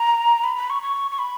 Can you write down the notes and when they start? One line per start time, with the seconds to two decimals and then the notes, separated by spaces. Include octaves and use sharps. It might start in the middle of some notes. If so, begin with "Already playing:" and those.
Already playing: A#5
0.44 B5
0.56 B5
0.70 C#6
0.82 C#6
1.11 C#6
1.19 B5